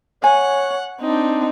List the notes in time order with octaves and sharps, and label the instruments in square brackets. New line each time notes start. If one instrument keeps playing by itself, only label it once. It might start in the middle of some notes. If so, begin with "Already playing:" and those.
[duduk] C#5 [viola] F#5 [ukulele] G#5
[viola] C4 D#4 [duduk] D4